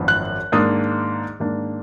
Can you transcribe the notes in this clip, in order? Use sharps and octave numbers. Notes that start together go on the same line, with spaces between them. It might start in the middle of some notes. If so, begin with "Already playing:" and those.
Already playing: G#1 F#2 F3 B3 D4
F#6
G#2 D#3 A#3 D4 D#6
G#2 D#3 A#3 D4